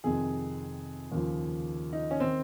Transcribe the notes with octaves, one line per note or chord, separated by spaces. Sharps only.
F2 C3 D#3 G#4
D#2 C#3 F3
D#4
C#4
D#3 C4